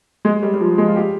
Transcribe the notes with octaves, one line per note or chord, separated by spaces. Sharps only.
G#3
G3
G3
F3
G#3
F4
G4